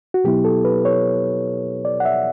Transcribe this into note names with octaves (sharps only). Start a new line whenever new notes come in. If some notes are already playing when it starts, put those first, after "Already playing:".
F#4
B2 F#3 B3 E4 G4
A4
B4
C#5
D5
F#5
E5